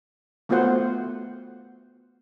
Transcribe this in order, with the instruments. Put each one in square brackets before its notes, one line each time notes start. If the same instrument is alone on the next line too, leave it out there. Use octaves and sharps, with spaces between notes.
[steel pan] A3 B3 F4 F#4 C5 F#5